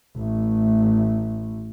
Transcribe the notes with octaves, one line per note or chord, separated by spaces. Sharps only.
A1 A3